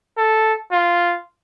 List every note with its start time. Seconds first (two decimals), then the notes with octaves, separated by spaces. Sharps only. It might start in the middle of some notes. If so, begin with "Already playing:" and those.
0.17 A4
0.72 F4